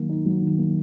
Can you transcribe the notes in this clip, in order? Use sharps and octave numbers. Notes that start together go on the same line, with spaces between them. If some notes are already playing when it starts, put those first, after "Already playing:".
Already playing: D#3 F#3 A#3
D#4
F#3
D#3
A#3